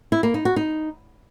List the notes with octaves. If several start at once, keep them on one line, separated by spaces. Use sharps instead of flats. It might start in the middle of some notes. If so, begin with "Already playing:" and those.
E4
A#3
D#4
F#4
D#4